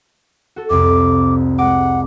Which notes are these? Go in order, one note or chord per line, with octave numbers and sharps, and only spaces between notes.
F#4 A4
C2 F2 D6
G#3 F#5 D6